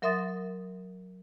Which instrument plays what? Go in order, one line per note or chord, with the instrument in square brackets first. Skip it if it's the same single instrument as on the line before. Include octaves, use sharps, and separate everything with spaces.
[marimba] F#3 A#4 E5 C6 D#6 A6